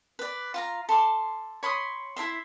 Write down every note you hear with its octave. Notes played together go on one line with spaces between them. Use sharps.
B4 D5
F4 F5 A#5
A4 C6 D6
C#5 B5 C6 D#6
E4 A#4 E5 C6